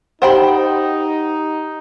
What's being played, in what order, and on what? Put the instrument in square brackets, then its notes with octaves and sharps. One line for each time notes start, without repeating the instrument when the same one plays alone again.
[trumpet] D#4 [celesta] G4 F#5 [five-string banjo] C5 G5 B5